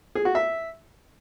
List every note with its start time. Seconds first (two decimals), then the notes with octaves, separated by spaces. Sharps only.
0.15 G#4
0.25 F#4
0.35 E5